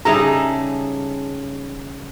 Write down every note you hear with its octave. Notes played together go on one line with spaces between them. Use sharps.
C#3 G3 D#4 G#4 A4 E5 A#5